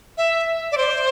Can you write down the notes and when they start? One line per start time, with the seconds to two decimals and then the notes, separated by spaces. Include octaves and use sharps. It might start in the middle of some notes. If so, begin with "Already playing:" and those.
0.18 E5
0.72 D5
0.78 C5